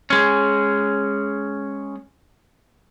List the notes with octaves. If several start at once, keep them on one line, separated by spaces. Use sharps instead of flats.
G#3 C#4